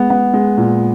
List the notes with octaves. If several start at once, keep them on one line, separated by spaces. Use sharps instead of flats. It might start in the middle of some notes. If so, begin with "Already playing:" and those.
Already playing: G#3 B3
B3
G#3
A#2